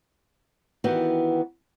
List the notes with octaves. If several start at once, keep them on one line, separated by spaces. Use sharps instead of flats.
D#3 E3 B3 F#4 G4